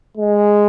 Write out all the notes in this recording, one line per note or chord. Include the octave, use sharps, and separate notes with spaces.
G#3